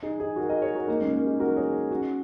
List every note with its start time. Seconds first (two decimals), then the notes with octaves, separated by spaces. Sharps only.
0.03 D#4 G#4
0.20 D#4 G#4
0.36 F#4 A#4
0.49 A#4 D#5
0.62 G#4 C#5
0.75 F#4 A#4
0.87 A#3 D#4
1.01 G#3 C#4
1.13 A#3
1.26 D#4 G#4
1.40 F#4 A#4
1.56 G#4 C#5
1.91 C#4 F#4